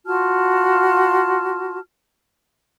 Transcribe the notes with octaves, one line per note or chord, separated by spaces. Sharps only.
F4 F#4 A5 F6